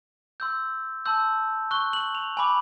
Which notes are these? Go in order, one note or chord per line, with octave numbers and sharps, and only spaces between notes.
C6 E6 G6
A5 C6 E6 G6
C#6 F#6 G7
F#7
F7
G#5 B5 D6 F#7